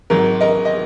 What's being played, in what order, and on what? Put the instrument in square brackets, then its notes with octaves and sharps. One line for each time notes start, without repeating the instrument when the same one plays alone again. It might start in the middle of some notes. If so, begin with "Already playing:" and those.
[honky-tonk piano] G#1 G#2 F#3 A#4
A#4 D#5
D#5